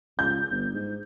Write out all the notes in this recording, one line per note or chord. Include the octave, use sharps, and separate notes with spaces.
C#2 G6
G1
G#2